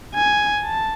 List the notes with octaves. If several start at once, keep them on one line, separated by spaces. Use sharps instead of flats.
G#5
A5